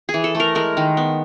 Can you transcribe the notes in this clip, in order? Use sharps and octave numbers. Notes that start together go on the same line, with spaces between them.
G#4
E3
A4
A3
A#4
G#3 A#4
D#3
B3